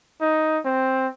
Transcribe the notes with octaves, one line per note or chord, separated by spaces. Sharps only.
D#4
C4